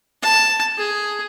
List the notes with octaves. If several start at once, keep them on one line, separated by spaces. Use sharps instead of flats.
A5
G#4